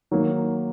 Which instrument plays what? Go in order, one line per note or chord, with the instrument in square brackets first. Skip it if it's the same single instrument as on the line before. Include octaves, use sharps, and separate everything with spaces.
[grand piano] D#3 F#3 A#3